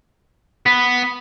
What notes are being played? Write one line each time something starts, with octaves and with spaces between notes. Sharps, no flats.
B3 B6